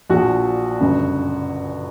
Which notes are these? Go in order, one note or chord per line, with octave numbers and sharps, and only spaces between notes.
A#1 A#2 F3 F#4
G1 F#2 C#3